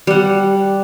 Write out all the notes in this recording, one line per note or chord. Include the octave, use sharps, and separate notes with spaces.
G3 F#5